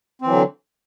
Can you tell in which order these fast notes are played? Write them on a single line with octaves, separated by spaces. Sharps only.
C4 E3 F#3 D3